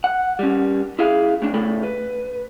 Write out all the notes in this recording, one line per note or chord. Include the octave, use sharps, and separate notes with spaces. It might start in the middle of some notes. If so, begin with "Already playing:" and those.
F#5
G3 C#4
E4 G#4 F5
A2 D4
A2 C#3 A3 A4 B5
B4